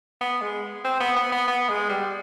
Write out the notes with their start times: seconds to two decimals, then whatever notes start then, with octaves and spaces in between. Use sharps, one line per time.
0.21 B3
0.41 G#3
0.85 C4
1.00 B3
1.16 B3
1.32 B3
1.47 B3
1.69 G#3
1.89 G3